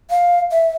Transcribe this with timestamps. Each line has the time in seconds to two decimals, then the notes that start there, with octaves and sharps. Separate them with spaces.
0.11 F5
0.52 E5